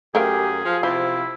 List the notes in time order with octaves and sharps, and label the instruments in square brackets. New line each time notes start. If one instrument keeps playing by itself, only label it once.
[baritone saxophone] F#2 [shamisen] A3 A#4 F5 [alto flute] G4 [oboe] G#4
[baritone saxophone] F3 [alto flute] F4
[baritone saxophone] C3 [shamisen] F3 [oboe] E4